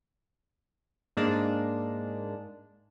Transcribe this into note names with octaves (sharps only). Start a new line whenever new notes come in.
G#2 G#3 A#3 D4